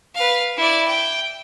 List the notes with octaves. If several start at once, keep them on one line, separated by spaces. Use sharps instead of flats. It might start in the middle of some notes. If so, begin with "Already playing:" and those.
B4 F5
E4 D5
G5